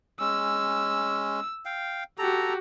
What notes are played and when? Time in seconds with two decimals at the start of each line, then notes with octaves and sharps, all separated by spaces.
0.20 G#3 C#4 E6
1.65 F5 G5
2.18 F#4 G4 A4 A#5